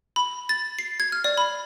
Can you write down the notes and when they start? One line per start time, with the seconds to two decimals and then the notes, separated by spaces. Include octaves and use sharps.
0.16 B5
0.49 A6
0.79 C7
1.00 G#6
1.12 F6
1.24 D5
1.37 B5